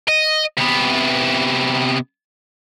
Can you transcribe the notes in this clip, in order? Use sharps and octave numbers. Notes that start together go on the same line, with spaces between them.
D#5
C3 B3